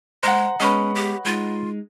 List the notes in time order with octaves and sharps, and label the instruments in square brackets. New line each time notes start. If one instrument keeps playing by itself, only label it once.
[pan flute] G#3 [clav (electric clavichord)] C5 [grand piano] F#5 A#5
[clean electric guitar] G#3 B3 [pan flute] C#4 [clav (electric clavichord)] B4 C#5 D#5
[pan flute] G4
[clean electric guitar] G#3 D#4 [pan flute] F4